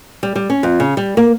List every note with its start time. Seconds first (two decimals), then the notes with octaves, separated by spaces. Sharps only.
0.23 G3
0.35 G3
0.50 C#4
0.63 F2
0.80 C#3
0.97 G3
1.17 A#3